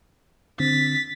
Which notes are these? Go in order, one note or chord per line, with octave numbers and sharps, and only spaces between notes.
D3 C4 A6 B6